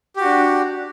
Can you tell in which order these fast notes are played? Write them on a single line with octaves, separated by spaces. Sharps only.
G4 F#4 D4